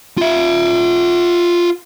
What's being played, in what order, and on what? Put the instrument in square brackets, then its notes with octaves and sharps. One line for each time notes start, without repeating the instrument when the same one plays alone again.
[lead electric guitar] F4 E5